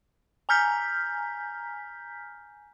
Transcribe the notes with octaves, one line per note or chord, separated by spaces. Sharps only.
G#5 A#5 F6 G6 B6